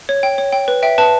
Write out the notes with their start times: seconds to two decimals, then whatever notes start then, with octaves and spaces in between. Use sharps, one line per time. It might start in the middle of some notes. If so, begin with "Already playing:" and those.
0.09 C#5
0.23 G5
0.38 C#5
0.53 G5
0.68 B4
0.83 E5 G5
0.98 B4 A5